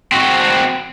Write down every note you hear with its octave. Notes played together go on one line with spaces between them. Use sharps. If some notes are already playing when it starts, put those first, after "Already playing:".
C4 F#4